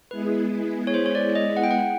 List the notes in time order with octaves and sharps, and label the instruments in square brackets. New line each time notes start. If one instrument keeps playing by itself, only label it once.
[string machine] G#3 B3 E4 G#4 [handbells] B4
[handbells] C#5
C5
C#5
D5
D#5
F#5
G5
F#5